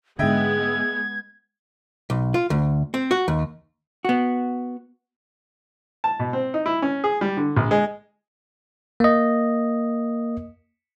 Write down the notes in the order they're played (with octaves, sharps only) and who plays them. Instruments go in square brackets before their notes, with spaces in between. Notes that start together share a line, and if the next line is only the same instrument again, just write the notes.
[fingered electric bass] G#2 D3 [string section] G#3 B3 [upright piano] D#5 E5 G5 [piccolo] G#6
[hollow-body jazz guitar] B1
F4
D2
C4
F#4
D#2
B3 F#4
[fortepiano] A5
B2
C4
D#4
E4
C#4
G#4
G3
D3
A#1
G#3
[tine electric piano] A#3 D#5